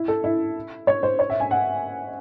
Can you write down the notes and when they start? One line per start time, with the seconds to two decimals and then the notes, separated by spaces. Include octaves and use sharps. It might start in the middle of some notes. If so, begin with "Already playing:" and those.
Already playing: E4
0.08 A4
0.24 E4
0.87 C#5
1.03 C5
1.19 C#5
1.30 E5
1.40 G#5
1.51 F#5